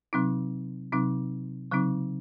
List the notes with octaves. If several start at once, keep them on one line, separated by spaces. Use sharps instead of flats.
C3 F#3 C4 D#4
C3 F#3 C4 D#4
C#3 F#3 C4 D#4